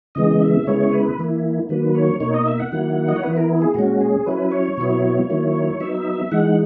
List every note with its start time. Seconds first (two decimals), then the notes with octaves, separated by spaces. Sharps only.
0.15 C#3 E3 G#3 B3 D#5
0.41 E5
0.67 C#3 G#3 B3 E4 C#5
0.92 B4
1.18 E3 A#3 E4
1.69 D#3 F#3 A#3 B4
1.95 C#5
2.20 B2 A#3 D#4 C#5
2.34 D#5
2.47 E5
2.60 F#5
2.72 D#3 F#3 A#3 E4
3.08 D#5
3.16 C#5
3.23 E3 B3 E4 B4
3.37 A#4
3.62 G#4
3.74 A#2 G#3 C#4 F#4
4.00 G#4
4.26 F#3 C#4 E4 B4
4.52 C#5
4.77 B2 F#3 B3 E4
5.30 D#3 F#3 A#3 E4
5.80 F#3 B3 D#4 E5
6.31 E3 G#3 D#4 F#5